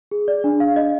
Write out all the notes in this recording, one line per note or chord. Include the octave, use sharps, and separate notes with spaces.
G#4
D5
D4
F5
D#5